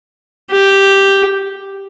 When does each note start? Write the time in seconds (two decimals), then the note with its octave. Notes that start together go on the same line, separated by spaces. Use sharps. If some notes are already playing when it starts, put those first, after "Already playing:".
0.51 G4